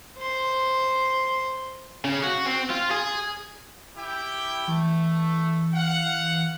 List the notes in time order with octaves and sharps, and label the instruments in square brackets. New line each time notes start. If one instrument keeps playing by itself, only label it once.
[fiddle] C5 C6
[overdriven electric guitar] C#3
F#4
C4
F4
G#4
[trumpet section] E4 G4 G5
[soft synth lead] E3 [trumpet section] A3
[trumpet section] F5 F#5